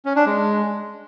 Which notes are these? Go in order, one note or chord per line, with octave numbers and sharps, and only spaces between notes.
C#4
D4
G#3